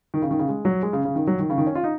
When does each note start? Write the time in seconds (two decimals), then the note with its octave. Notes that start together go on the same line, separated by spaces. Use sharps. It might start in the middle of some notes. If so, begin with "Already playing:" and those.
0.14 D#3
0.22 C#3
0.31 D#3
0.39 C#3
0.49 G#3
0.65 F#3
0.83 G#3
0.93 C#3
1.05 C#3
1.15 D#3
1.27 F#3
1.39 D#3
1.50 C#3
1.58 D#3
1.67 C#4
1.75 F4
1.84 D#4